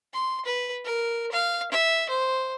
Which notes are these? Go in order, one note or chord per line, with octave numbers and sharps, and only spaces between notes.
C6
B4
A#4
F5
E5
C5